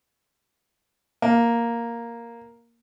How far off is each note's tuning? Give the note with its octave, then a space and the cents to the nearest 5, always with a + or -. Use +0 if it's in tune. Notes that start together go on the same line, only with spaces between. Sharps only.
A#3 +0